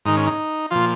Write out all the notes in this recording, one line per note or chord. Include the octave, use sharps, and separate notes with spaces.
G#2 D#3 D#4
C#4
D#4
A#2 F3 F4